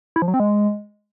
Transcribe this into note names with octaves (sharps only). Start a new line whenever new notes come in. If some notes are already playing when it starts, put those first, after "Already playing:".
E4
F3
F#3
C4
G#3